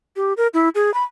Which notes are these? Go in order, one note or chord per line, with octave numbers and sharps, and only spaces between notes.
G4
A#4
E4
G#4
B5